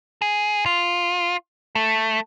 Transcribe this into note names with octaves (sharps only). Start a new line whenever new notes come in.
G#4
F4
A3